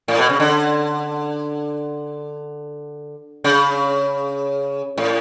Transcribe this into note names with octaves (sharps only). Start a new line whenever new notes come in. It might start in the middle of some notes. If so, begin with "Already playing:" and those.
A2
B2
C#3
D3
C#3
A2